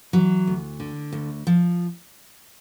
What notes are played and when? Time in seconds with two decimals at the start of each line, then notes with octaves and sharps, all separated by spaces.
0.13 E3 F#3
0.47 D2
0.80 D3
1.12 D2
1.47 F3